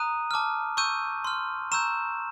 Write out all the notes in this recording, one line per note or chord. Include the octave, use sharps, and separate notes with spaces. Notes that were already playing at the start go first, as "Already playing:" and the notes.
Already playing: A#5 D#6 F#6 D#7
A5 D6 F6
C#6 E6 G6 D#7
C6 F6
A#5 C#6 E6 G6 E7